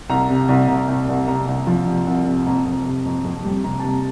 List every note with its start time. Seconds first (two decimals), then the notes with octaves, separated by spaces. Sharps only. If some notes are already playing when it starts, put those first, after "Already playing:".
0.10 C2 A#5
0.29 C3
0.49 C2
0.68 C2
0.88 C2
1.08 C2
1.27 C3 A#5
1.47 C2
1.67 F3
1.87 C3
2.07 C2
2.26 C3
2.46 F2 A#5
2.65 F2
2.85 C3
3.05 F2
3.25 F2
3.45 G3
3.64 C3 A#5
3.80 A5
3.83 C3 A#5